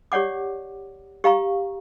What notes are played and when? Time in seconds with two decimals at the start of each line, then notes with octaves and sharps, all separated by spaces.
0.12 G4 C#5 D5 F#5 D6
1.24 G4 F5 A#5 C#6